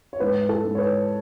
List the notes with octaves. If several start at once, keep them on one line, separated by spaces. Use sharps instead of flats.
C#5
G#2 B4
A4
G#2
C#5
B4